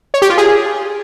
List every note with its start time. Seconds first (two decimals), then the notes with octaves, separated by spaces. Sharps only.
0.14 C#5
0.22 G4
0.30 F4
0.38 G#4